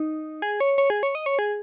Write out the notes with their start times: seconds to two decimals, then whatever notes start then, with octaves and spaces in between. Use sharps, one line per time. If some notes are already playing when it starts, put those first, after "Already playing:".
Already playing: D#4
0.42 G#4
0.60 C#5
0.78 C#5
0.90 G#4
1.03 C#5
1.15 D#5
1.26 C#5
1.39 G#4